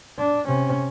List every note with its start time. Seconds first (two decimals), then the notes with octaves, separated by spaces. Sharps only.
0.19 D4
0.47 C3 C#4